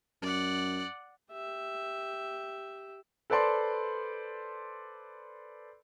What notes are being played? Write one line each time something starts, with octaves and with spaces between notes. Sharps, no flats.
F#2 D5 F#5
G4 E5
A4 B4 C5 D5 A5 C6